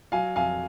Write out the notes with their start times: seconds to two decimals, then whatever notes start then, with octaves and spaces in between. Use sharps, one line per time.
0.12 F#3 F5 G#5
0.36 F2 F5 G#5